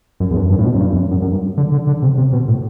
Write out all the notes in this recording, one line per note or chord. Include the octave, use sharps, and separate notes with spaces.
F#2
E2
G2
F#2
G2
A2
B2
F#2
G2
E2
F#2
F#2
F#2
G2
D3
D3
D3
C3
C3
B2
A2